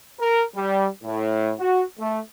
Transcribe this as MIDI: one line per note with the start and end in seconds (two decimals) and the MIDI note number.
0.19 0.43 70
0.55 0.87 55
1.03 1.52 45
1.58 1.83 66
1.98 2.19 57